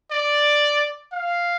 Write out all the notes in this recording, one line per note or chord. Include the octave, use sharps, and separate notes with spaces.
D5
F5